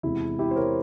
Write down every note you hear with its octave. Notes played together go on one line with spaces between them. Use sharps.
E2 C3 E3 G#3 E4
E4 G4
C5
A#4 C#5